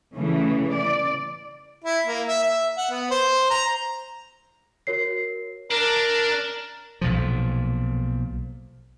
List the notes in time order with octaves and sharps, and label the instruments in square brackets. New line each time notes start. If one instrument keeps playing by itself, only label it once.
[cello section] C#3 E3 A3
D5
[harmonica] E4
A#3
E5
E5
F#5
B3
C5
A#5
[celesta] F#4 A#4 C#5 C7
[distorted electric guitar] D4 [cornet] A#4
[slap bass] B1 A#2 F3